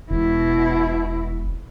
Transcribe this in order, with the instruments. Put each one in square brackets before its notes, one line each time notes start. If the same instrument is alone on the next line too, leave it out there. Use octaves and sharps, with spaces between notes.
[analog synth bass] E1 [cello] B2 E4